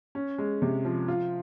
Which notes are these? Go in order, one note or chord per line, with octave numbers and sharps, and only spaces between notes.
C#4
G#3
C3
F3
F4